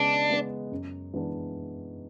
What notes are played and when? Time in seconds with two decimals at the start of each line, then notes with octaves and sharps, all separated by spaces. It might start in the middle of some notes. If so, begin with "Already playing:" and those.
Already playing: C#3 G#3 B3 D4
0.30 G#3 B3
0.72 F#2
1.14 E3 G#3 B3 D4